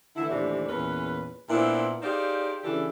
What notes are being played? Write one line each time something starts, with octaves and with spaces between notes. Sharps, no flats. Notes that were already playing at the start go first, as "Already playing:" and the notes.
D3 E3 A3 E4
D#2 A2 C3 E3 D4
E2 A#2 C#4 B4
A#2 B3 C4 D4 E4
D#4 G4 G#4 C5 D5 F5
C#3 E3 D4 E4 G4 A4